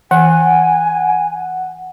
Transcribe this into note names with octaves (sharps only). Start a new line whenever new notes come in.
E3 F#5 G#5